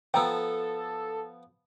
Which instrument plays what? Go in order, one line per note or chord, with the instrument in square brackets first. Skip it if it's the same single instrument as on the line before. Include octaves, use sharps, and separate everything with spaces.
[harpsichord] F3 B3 [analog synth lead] A4 [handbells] G5 A#5 E6